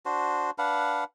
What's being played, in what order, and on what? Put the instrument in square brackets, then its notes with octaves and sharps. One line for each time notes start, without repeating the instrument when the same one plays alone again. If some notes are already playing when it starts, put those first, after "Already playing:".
[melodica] D4 F#4 C5
D4 B4 F5 F#5